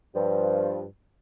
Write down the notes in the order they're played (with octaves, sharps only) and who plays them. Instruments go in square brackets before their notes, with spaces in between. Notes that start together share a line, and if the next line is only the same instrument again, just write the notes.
[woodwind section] G2 F3